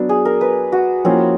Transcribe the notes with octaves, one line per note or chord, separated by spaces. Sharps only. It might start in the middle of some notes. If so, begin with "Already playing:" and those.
Already playing: F#3 B3 D4
G#4
A#4
B4
F#4
F3 A#3 C4 C#4 E4